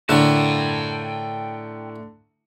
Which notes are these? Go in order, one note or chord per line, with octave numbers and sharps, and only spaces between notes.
A2 D3 A3 A#4 G5 A5